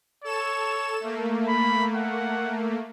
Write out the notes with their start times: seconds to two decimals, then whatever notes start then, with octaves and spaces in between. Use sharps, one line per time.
0.24 A4 C#5 E7
1.00 A3 A#3
1.48 B5
1.95 F#5